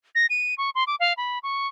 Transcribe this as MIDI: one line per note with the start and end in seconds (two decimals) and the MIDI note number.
0.15 0.26 94
0.30 0.54 99
0.58 0.70 85
0.75 0.84 84
0.87 0.95 86
1.00 1.13 77
1.17 1.39 83
1.43 1.67 85